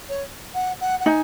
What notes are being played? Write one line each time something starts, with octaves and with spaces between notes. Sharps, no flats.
C#5
F#5
F#5
F#5
D#4 G#5